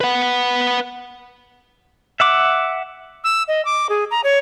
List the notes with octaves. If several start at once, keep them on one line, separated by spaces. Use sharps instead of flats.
B4 F#5
E5 F#5 D6
E6
D#5
D6
G#4
A#5
C#5